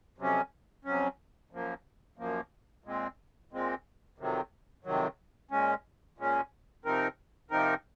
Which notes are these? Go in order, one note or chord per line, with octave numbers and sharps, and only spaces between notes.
F2 C3 F#3 C#4
F2 C3 F#3 C#4
F#2 F3 A#3
F#2 F3 A#3
A#2 G#3 C4
A#2 G#3 C4
F2 C3 D#3 F#3
F2 C3 D#3 F#3
A#2 G#3 C#4
A#2 G#3 C#4
C3 F3 C4 D#4 A#4
C3 F3 C4 D#4 A#4